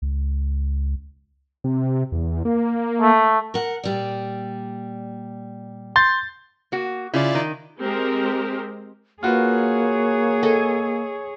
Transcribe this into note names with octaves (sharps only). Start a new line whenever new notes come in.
C#2
C3
E2
A#3
A3
A#4 F#5
A#2 G3 D5
C6 G6 A6
A#3 F#4
C#3 E4 F4 D5
D#3
G#3 C4 G4 A#4
A#3 F4 F#4 G#4 B4 C#5
A4 D#5 G#5